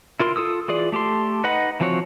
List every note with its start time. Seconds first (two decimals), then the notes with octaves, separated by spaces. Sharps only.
0.20 E4 F4 A#4 C6
0.36 F4 A4 D#6 E6
0.68 E3 F4 G#4 D5
0.92 A3 G4 A4 C6
1.44 D#4 B4 D#5 F#5 B5
1.80 E3 F3 C4 F#4 C#5